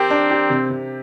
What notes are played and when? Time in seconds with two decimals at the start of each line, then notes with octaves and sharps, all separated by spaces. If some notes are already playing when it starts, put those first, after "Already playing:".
Already playing: C4 G4 A#4
0.10 D4
0.31 G4
0.50 C3
0.70 C3